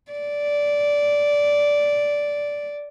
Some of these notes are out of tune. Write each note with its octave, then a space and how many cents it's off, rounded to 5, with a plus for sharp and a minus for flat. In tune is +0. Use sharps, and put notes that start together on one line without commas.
D5 -10